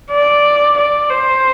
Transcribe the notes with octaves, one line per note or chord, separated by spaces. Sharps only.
D5
D5
C5